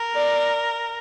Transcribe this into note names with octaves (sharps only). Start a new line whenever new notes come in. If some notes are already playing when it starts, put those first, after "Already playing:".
Already playing: A#4
D5